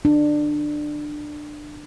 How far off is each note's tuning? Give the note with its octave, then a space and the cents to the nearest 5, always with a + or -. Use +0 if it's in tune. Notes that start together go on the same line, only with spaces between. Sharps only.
D4 +20